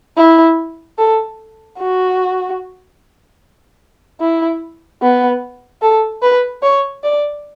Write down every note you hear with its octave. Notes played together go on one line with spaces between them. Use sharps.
E4
A4
F#4
E4
B3
A4
B4
C#5
D5